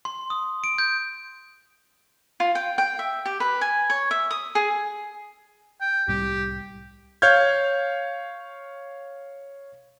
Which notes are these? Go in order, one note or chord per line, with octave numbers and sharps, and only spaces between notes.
C6
D#6
D7
G6
F4
G5
G5
E5
G4
B4
G#5
C#5
E5
D#6
G#4
G5
C2 A2 G3 G4
C#5 F5 F6 G6 G#6